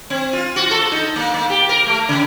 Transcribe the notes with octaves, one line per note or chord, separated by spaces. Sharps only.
C4
F4
F#4
A4
D#4
A#3
A#3
G4
A#4
A3
C#3